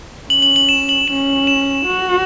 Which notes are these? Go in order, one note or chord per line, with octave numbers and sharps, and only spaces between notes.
C#4 F#7
F#7
F#7
E7
F#7
C#4 E7
E7
F#4